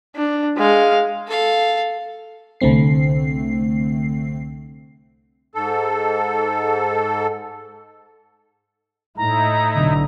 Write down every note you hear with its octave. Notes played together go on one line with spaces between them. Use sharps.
D4
G#3 F5
A4 F5
C2 D3 A3 C4 C7
G#2 A4
A2 D#4 E4 A#5
B1 D3